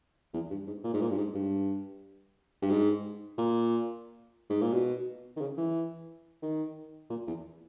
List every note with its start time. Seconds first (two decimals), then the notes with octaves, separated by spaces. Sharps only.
0.34 E2
0.51 G2
0.67 G#2
0.84 A#2
0.94 G#2
1.02 A#2
1.10 G2
1.18 G#2
1.35 G2
2.62 G2
2.71 G#2
3.38 A#2
4.50 G#2
4.62 A#2
4.73 B2
5.37 D#3
5.41 C#3
5.58 E3
6.43 D#3
7.10 A#2
7.28 E2